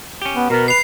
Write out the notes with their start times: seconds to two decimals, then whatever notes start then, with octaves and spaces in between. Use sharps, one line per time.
0.22 C#4 G4
0.36 B3
0.50 B2 B3 A#4
0.68 B4 C7 F7